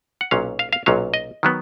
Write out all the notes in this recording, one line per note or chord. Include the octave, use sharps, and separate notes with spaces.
F#5
B1 A#2 F#3 C#4 F5
F5
F5
B1 A#2 F#3 C#4 F5
D#5
D#3 F#3 B3